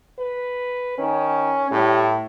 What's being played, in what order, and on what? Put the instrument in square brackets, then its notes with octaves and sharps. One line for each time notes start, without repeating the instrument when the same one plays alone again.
[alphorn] B4
[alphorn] D#3 [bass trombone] C#4
[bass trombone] A2 [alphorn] G3